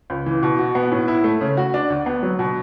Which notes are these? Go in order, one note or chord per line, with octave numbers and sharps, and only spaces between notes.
C#2
E3
B2
F#4
B3
A2
E4
A3
C#3
F#4
D4
D2
B3
F#3
B2